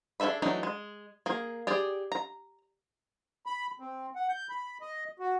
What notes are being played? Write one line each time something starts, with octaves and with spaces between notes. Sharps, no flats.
D4 G#4 A4 E5 B5
E3 F#3 A3 D4 D#4
G#3
A#3 G#4
G4 G#4 D5
A#5
B5
C4
F#5
G6
B5
D#5
F#4